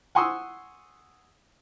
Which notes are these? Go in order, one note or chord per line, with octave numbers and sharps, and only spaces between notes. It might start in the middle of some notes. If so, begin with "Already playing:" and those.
F#5 G#5 C6 C#6 D#6 E6